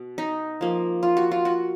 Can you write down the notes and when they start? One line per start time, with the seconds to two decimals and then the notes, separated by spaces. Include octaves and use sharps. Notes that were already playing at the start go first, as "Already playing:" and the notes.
Already playing: B2
0.18 D#4
0.61 F3 A#3
1.03 F4
1.17 F#4
1.31 F4
1.45 F#4